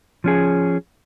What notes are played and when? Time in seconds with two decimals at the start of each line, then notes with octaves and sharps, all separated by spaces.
0.24 F3 C#4 G#4